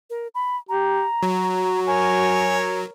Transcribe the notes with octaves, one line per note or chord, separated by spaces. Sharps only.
A#4
B5
G4 A#5
F#3 F#4
A#4 C#5 G#5